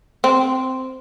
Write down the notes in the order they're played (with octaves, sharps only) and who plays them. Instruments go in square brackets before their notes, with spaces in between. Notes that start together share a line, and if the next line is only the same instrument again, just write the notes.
[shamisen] C4